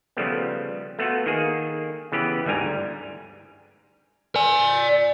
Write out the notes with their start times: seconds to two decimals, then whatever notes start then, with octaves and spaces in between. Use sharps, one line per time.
0.17 C#3 F3 G3 A3 B3
0.99 A3 B3 F4 F#4
1.26 D#3 A#3 G#4
2.12 C#3 E3 B3 G4 B4
2.46 G1 D2 G#2 G3 G#5 A#5
4.36 D5 G#5